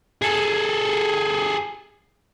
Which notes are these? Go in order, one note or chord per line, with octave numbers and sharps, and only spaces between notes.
G#4 A4